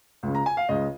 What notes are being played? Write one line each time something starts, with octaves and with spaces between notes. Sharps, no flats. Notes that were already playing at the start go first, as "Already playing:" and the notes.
C#2 C#3
A#5
G#5
F5
C#2 C#3 D#5